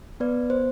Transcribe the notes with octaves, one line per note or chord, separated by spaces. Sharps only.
B3 B4 D5
C5